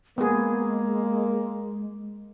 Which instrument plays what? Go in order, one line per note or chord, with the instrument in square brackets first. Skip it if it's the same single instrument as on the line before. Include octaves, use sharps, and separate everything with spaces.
[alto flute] G#3 [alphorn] A#3 [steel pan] B3 G#4